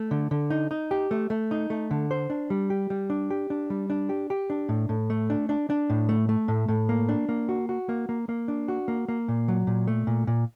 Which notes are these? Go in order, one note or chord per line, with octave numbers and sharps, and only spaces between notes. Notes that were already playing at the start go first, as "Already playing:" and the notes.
Already playing: A3
D3
D3
D#4
D#4
G4
A3
A3
D#4
A3
D3
C5
D4
G3
G4
G3
D4
G4
D4
G3
D4
G4
G4
D4
A2
A2
A3
D4
D4
D4
A2
A3
A3
A2
A2
A#3
D4
A#3
F#4
F#4
A#3
A#3
A#3
D4
F#4
A#3
A#3
A#2
F#3
A#2
A3
A#2
A#2